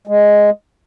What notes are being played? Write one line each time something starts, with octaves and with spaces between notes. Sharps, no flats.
G#3